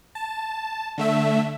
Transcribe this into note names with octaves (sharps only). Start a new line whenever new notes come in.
A5
D3 A3 E5